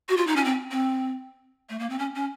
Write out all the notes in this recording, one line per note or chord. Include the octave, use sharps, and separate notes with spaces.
F#4
F4
D#4
C#4
C4
C4
A3
A#3
C4
C#4
C#4